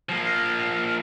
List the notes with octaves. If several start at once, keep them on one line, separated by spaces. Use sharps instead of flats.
F3 A#3